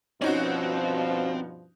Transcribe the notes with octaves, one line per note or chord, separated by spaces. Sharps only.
G2 B2 F3 C4 C#4 D#4 F#4